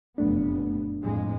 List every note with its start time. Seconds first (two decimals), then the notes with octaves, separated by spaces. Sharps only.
0.18 F1 F#2 A#2 A3 B3 D4
1.03 F2 A2 G#3